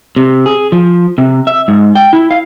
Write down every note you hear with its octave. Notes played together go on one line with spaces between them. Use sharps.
C3
G#4
F3
C3
E5
G#2
G5
E4
F5